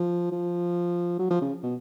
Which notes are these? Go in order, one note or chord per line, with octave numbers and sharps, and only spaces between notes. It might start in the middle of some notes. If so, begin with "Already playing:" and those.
Already playing: F3
F3
F#3
F3
C#3
B2